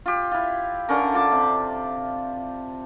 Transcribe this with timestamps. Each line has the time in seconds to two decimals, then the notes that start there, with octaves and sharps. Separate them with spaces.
0.06 F4 G4
0.32 E4 F4
0.89 D3 C#4 A#4
1.14 F4 A5 D6
1.32 C3